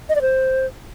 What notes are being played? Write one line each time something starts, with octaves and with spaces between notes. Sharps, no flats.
D#5
D5
C5